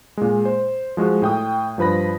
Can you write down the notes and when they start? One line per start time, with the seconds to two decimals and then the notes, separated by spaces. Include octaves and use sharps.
0.17 A#2 G#3
0.45 C5
0.97 F3 G#3 F#4
1.22 A2 G5 D#6
1.78 G2 F3 B4 B5 A#6